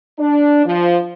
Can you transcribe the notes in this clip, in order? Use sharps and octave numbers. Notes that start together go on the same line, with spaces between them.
D4
F3